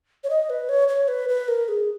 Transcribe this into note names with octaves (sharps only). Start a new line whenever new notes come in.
C#5
D#5
B4
C#5
C#5
B4
B4
A#4
G#4